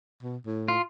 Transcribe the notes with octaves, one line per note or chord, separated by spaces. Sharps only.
B2
A2
F4